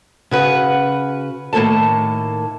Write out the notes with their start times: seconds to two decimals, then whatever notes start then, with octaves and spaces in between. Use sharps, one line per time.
0.31 C#3 F#4 B4
1.53 A2 D#3 A#3 A4 A5